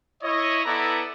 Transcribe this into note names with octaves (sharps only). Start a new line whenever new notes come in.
E4 C#5 D#5
B3 E4 A4 B4 D5 A#5